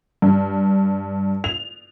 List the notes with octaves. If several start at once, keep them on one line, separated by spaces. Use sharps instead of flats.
G2
F7